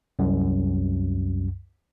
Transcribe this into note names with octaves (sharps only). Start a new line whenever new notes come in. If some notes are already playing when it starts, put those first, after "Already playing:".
C2 F#2